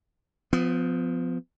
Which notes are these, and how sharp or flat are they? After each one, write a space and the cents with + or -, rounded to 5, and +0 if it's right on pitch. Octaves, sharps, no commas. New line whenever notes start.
F3 +10 B3 +40